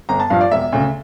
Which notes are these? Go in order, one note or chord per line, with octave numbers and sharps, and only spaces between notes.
G1 A#5
A5
G2 F3 F5
D5
E1 E5
D2 C#3